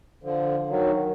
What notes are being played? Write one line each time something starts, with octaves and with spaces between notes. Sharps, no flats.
D3 F3
D#3 F#3